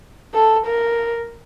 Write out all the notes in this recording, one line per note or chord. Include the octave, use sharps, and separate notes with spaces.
A4
A#4